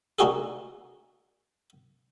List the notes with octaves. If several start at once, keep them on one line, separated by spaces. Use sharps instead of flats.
A#3 D4 D#4 F#4 G#4 A4